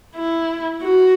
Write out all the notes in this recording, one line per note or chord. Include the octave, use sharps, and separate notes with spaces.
E4
F#4